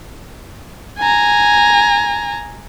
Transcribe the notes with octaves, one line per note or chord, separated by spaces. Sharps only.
G#5 A#5